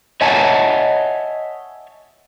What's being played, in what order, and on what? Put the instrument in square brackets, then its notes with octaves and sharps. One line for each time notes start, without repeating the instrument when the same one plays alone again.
[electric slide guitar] C#5 D#5 E5 F#5 G#5 A5